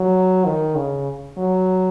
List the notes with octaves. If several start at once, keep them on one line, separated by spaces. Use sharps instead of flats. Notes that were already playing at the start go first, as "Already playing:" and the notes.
Already playing: F#3
D#3
C#3
F#3